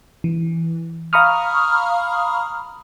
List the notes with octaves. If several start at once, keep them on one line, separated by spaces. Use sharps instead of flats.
E3
F5 A#5 B5 C#6 D#6 F6